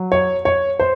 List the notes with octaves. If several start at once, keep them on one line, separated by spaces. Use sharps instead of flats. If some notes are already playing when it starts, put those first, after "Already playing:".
Already playing: F#3
C#5
C#5
C5